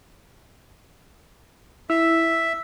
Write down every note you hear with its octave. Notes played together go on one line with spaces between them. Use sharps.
E4 E5 E6